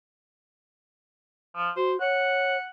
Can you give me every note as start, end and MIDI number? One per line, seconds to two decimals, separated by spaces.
1.55 1.70 53
1.77 1.99 66
1.77 1.92 72
2.00 2.57 73
2.00 2.69 78